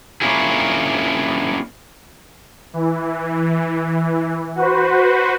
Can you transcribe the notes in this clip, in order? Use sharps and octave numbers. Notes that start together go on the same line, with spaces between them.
A#3 C#4 D4 E4 F4 G#4
E3
F#4 B4 C5